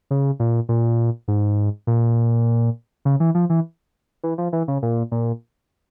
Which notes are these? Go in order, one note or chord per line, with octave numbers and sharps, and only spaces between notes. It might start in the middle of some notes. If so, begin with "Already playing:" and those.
C#3
A#2
A#2
G#2
A#2
C#3
E3
F3
E3
E3
F3
E3
C#3
A#2
A#2